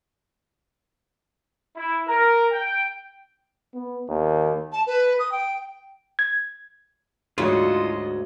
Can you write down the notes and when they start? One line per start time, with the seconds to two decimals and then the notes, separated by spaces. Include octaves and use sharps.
1.76 E4
2.08 A#4
2.51 G5
3.74 B3
4.08 D#2
4.72 A5
4.87 B4
5.19 D#6
5.32 G5
6.19 G#6
7.38 D2 G#2 F#3 F4 F#4 A4 C#5 D#5